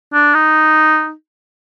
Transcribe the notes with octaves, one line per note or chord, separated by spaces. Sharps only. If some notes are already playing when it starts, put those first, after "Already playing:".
D4
D#4